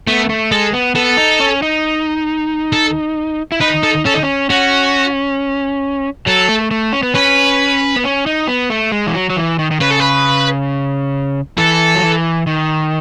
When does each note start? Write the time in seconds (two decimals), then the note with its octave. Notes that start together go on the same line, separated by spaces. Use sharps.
0.07 A3 B3
0.29 A3
0.52 G#3 A4
0.73 B3
0.95 B3 A4
1.17 D#4
1.40 C#4
1.62 D#4
2.73 A4
3.52 E4
3.61 D#4 B4
3.83 A4
4.05 C#4 A4
4.14 D#4
4.23 C#4
4.50 C#4 F#4
6.26 F#3 A4
6.49 A3
6.71 A3
6.93 C#4
7.03 B3
7.14 C#4 B4
7.96 B3
8.04 C#4
8.26 D#4
8.48 B3
8.70 A3
8.92 G#3
9.07 E3
9.15 F#3
9.30 F#3
9.36 E3
9.59 D#3
9.71 D#3
9.80 C#3 B4
9.91 A4
10.00 B4
11.58 E3 A4
11.95 F#3
12.03 E3
12.47 D#3